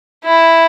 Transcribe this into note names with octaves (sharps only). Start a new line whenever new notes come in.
E4